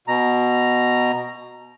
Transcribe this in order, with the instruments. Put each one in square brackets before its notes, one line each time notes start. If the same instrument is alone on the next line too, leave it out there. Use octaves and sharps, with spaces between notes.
[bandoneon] B2 A#5